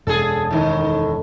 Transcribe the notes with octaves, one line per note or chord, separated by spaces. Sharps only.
E1 F#2 G#4 A4
A2 D#3